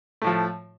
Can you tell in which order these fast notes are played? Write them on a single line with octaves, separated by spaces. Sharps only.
A3 A2 F3